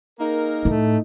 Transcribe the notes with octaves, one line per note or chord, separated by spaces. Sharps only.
A#3 D#4 G#4 A#4
A2 A3